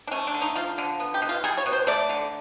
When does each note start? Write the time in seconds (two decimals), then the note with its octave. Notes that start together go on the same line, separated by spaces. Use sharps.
0.07 D4
0.11 A3 C#4
0.27 D4
0.34 D3
0.41 D#4
0.56 F3 F4
0.78 D3
1.00 B3
1.14 G4
1.22 B2
1.29 F4
1.44 G3 G#4
1.57 C#5
1.66 B2
1.72 C5
1.87 A3 D5
2.09 D3